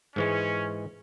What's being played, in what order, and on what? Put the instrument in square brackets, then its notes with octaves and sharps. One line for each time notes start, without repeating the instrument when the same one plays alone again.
[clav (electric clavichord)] G#2 E3 G#3 [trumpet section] C#4